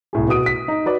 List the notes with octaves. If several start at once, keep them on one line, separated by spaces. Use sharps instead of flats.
C2 A2 G#4
B2 F#4 D#6 D7
B6
D#4
F#4 B4 D5